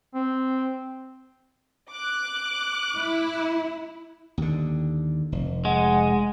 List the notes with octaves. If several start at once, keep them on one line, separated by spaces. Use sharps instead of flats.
C4
D6 F#6
E4
D#2 D3
F1
G#3 F#5